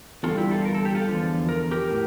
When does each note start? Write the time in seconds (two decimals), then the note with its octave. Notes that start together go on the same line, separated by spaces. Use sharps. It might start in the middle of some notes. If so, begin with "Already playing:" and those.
0.23 E2 D3 G3 F4 A4
0.37 E4 G4
0.51 F4 A4
0.65 A#4
0.75 A4
0.85 G4
0.95 F4 A4
1.08 E2 D3 F3
1.49 A#4
1.71 G4 A#4
1.90 A2